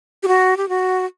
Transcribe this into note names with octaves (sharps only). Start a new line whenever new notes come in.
G4
F#4
G4
F#4